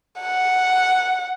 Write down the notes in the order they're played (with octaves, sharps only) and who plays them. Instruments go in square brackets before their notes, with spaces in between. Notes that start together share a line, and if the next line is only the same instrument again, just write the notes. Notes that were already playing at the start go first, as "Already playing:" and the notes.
[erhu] F#5